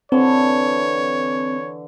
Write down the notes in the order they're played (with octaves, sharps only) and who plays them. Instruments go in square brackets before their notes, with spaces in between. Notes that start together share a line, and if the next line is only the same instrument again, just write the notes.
[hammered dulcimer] D3 E3 [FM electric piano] C4 [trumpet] C#5